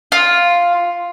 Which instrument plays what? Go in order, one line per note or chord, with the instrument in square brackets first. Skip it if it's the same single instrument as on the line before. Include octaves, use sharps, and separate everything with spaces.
[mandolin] F4